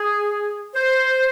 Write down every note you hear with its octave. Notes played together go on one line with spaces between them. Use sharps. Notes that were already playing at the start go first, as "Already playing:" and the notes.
Already playing: G#4
C5